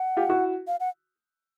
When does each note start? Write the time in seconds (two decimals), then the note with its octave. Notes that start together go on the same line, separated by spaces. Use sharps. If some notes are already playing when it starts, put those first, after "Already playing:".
Already playing: F#5
0.17 F4 G4
0.29 E4 F#4
0.67 F5
0.80 F#5